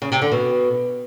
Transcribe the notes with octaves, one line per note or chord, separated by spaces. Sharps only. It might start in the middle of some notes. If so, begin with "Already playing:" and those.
C#3
C3
D3
B2